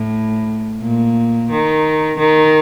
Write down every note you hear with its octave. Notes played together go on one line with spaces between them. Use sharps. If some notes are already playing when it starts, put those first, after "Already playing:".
Already playing: A2
A#2
D#3
D#3